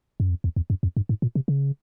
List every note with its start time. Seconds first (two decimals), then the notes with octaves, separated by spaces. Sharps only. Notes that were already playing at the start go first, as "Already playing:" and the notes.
0.20 F#2
0.30 F2
0.44 E2
0.56 E2
0.70 F#2
0.83 F2
0.97 G2
1.09 G#2
1.22 A#2
1.35 C3
1.48 C#3